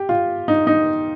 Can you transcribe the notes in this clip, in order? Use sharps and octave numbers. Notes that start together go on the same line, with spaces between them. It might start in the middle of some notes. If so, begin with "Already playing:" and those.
Already playing: G4
F4
D#4
D#4